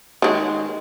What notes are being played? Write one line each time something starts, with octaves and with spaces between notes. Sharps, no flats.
D#3 G#3